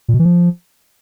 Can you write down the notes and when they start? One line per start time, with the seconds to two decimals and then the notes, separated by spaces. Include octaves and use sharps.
0.08 A#2
0.14 B2
0.19 E3
0.25 F3